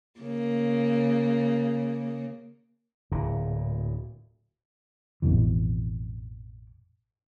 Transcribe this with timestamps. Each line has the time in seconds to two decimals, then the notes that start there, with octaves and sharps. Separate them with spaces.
0.21 C#3 A#3
3.11 D1 A#2
5.22 A1 F2 B2 E3